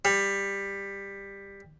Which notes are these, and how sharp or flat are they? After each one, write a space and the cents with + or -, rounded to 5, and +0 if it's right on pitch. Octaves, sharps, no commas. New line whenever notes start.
G3 +15